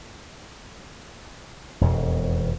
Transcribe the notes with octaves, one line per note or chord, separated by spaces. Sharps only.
E1 F2 B2